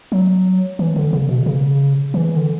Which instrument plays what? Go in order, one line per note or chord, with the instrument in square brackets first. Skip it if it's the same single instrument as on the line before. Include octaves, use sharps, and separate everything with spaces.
[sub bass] F#3
E3
D3
C#3
B2
C#3
E3
D3